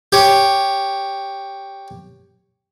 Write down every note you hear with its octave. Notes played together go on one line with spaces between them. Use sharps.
G4 C#5